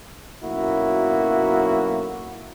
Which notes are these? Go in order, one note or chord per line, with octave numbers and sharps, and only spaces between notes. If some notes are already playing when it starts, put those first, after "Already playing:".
B1 F#2 A#3 E4 F#4